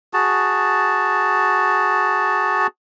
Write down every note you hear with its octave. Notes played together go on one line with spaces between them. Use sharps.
F#4 G#4 A5